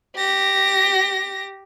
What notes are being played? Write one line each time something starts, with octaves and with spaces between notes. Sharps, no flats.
G4 A#6